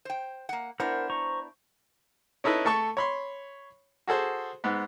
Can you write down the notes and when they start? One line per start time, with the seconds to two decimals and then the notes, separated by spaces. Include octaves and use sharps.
0.05 C5 G5
0.49 A#3 F#5
0.80 B3 D4 E4 A#4 C5 F#5
1.10 C5 A#5 C#6
2.44 C#4 D#4 E4 A4 B4
2.65 A3 A4 A5 C#6
2.97 C#5 B5 C6
4.07 F#4 G#4 A4 C5
4.64 G#2 B3